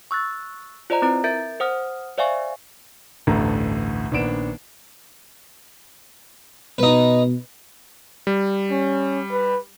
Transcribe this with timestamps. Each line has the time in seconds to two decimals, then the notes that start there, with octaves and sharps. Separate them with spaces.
0.11 C#6 E6 F#6 A6
0.90 F4 C5 D5 D#5 A#5
1.02 C4 E4 B4 A#5
1.24 A#4 E5 G6 A6 D7
1.60 C5 F#5 D#6 F6
2.18 C5 D5 E5 F5 G#5 C#6
3.27 A1 D2 G2 A4 A#5
4.11 A#1 D#3 B3 D4 D7 E7
6.78 B2 D#4 B4
8.27 G3
8.71 C#4
9.31 B4